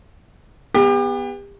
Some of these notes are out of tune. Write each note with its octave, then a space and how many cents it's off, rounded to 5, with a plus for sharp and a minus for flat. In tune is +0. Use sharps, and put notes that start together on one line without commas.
B3 -5 G4 +35